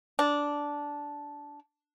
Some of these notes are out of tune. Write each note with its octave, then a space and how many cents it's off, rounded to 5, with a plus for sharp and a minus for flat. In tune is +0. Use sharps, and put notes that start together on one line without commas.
D4 -10